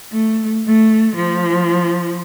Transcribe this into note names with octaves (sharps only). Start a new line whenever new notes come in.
A3
A3
F3